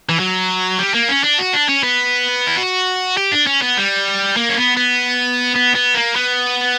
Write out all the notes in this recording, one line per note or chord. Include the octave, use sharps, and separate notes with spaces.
E3
F#3
G3
A#3
C#4
D4
F#4
D4
C#4
B3
E4
F#4
G4
D4
C#4
B3
G3
A#3
C#4
B3
B3
B3
B3
A#3
B3